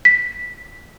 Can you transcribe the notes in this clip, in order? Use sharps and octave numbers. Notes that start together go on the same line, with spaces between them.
B6